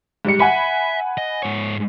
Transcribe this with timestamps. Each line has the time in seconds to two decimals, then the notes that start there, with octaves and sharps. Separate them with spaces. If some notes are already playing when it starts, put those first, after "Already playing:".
0.25 G#2 G3 C#7
0.40 E5 F#5 G#5 B5
1.18 D#5
1.43 G#2 C#5